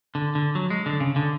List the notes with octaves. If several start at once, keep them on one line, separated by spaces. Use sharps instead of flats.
D3
D3
F#3
G#3
D3
C#3
D3